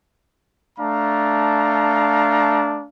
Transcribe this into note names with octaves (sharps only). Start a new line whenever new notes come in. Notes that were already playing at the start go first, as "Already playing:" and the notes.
A3 D4 F5 A#5